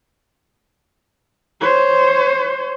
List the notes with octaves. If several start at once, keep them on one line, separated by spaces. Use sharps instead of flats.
C5 C#5